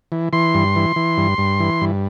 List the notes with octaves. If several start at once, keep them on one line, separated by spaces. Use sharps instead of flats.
E3
E3 C6
G2
E3
E3
G2
G2
E3
G2